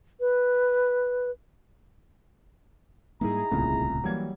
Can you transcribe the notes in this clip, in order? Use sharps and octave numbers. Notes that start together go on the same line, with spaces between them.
B4
G#2 G3 A#3 D#4 E4 G#4 A#5
D1 C2 A#2 C#3 A3
E3 F#3 G3 A#3 G#6